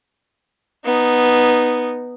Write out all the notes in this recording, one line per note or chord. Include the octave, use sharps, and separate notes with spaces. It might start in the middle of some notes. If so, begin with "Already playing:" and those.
B3 D#4